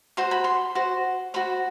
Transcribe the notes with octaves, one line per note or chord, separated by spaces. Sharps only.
F#4 C5 C6
B5
C6
F#4 C5
F#4 C5 B5